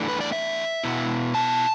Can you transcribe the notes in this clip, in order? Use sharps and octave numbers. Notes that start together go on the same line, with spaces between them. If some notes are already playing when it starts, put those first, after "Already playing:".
Already playing: E2 E3 A3 D4
B4
D5
E5
B2 B3 E4
A5